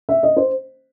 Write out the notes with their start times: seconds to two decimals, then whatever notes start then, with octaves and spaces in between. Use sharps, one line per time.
0.09 E5
0.23 D#5
0.37 C5